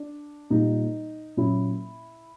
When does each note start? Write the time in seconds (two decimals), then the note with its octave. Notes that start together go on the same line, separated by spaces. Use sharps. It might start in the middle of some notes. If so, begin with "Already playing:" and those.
Already playing: D4
0.50 A#2 G3 A#3 D#4
1.37 A#2 F#3 A#3 C#4 E4